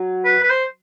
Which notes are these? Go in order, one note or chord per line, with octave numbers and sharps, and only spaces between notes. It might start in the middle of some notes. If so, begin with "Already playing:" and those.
Already playing: F#3
B4
B4
C5